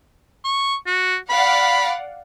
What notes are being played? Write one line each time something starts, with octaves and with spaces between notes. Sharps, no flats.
C#6
F#4
D5 F5 F#5 B5